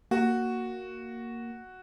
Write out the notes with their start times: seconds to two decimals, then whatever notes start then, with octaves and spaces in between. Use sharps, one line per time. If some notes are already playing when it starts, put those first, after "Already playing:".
0.11 A#3 F#4